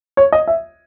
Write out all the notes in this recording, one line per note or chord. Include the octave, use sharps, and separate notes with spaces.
C#5
D#5
E5